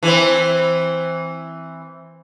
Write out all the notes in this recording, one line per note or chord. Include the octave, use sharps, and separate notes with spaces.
E3 C4